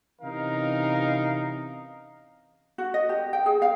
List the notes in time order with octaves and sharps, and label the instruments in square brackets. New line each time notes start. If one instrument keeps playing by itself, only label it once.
[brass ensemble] C3 E3 C#4 D#4 A#4 F5
[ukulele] F#4
D#5
G4
G5
G#4
F5